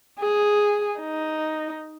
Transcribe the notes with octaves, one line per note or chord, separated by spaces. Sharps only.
G#4
D#4